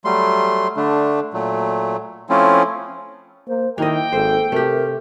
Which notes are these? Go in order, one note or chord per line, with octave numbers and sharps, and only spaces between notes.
F#3 G3 A3 C6
D3 A3 D4
A#2 F#3 A3
F3 A3 C4 C#4 E4 F4
A#3 C5
D#3 A#3 E4 D#5 G5
G#1 A4 C5
C3 A3 G4 A#4